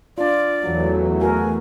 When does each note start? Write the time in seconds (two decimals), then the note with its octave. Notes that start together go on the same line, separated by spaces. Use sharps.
0.18 D4 F4 D5
0.63 E2 E3 F#3 A3
1.21 F#4 G#4 A#4 G#5